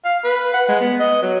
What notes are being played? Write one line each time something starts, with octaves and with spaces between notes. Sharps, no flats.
F5
B4
F#5
G#3
B3
D#5
F#3